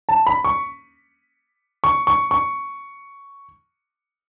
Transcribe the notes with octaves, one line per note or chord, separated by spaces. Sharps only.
A5
B5
C#6
C#6
C#6
C#6